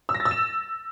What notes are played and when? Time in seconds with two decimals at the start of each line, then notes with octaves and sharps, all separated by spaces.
0.09 E6
0.14 A#6
0.20 A6
0.25 E6
0.31 E7